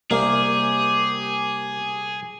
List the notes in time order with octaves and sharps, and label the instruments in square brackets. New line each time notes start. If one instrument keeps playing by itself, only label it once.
[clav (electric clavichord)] C2 [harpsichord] A#3 [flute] G4 [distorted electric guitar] G#4